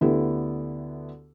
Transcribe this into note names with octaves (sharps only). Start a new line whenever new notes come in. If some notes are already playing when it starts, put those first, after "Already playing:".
D2 D3 B3 E4 G4